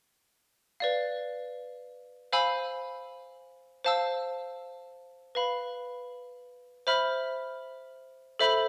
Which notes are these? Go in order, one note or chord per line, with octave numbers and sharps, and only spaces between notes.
B4 D5 F5
C5 F5 G#5 B5 E6
C5 F5 A5 E6
B4 F5 B5
C5 E5 B5 F6
A4 C5 E5 B5